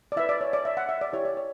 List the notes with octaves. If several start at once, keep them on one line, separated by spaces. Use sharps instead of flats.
D5
E4 B4 E5
D5
C#5
D5
E5
F#5
E5
D5
E4 G4 C#5
D5
C#5